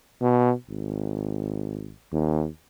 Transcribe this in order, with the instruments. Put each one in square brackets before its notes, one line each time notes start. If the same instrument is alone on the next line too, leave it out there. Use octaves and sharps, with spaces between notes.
[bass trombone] B2
G#1
D#2